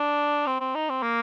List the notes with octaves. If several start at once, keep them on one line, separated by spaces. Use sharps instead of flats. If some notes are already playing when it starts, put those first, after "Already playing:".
Already playing: D4
C4
C4
D#4
C4
A#3